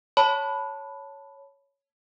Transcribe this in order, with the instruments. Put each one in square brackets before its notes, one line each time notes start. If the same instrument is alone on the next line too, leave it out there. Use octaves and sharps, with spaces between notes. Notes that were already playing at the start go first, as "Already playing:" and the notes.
[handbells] C#5 A5 B5